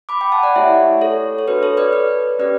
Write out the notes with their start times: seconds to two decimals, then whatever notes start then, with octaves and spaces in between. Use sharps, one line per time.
0.09 B5 D6
0.21 G5 B5
0.32 F#5 A5
0.43 D5 F#5
0.55 A3 E4 G4 C#5 E5
1.01 A4 C#5
1.39 C#5
1.47 D4 F#4 A4 B4
1.63 A4 C#5
1.77 B4 D5
1.93 B4
2.39 C#4 G4 B4 D5